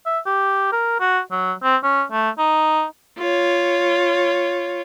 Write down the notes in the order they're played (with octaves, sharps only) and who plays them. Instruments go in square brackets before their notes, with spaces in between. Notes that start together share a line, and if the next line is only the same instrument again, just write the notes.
[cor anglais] E5
G4
A#4
F#4
F#3
C4
C#4
A3
D#4
[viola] F4 C#5